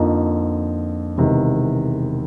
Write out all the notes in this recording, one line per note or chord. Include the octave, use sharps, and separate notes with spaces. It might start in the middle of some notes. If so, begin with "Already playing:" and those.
Already playing: F2 D3 F3 A#3 D#4
E1 E2 C3 D#3